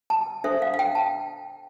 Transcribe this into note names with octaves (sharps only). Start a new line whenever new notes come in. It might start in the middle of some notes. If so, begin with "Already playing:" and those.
A5
D4 A4 C5 E5
F5
F5
G5
A5